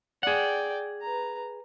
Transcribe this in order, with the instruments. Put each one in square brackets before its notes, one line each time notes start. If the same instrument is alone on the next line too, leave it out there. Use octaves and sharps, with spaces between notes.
[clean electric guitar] G#4 F#5 [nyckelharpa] D5 G5
[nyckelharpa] B4 A#5